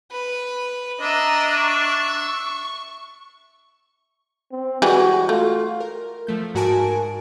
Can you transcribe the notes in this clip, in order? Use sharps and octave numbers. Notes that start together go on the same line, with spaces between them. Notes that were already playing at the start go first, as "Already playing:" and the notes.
B4
D4 D#5 E5 A#5
C#6
C4
E3 G3 G#3 F#4
A3 F4
A#4
F3 A3 G6
G#2 F#4 A#4 G#5 A5 D7